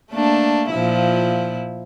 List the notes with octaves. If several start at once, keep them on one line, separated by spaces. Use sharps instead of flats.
A3 A#3 D4
A#2 F3 E4